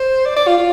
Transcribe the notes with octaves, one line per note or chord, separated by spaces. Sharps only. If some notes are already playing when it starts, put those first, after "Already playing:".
Already playing: C5
D5
D5
F4
F4